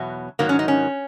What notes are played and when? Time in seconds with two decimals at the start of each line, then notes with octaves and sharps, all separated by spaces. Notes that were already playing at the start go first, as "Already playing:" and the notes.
Already playing: E2 B2 F#3
0.39 G#2 D#3 F#3 A#3
0.49 C#4
0.59 D#4
0.68 C#4